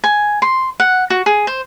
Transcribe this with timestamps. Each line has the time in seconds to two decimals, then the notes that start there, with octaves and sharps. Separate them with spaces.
0.04 G#5
0.42 C6
0.80 F#5
1.10 F#4
1.26 G#4
1.47 C5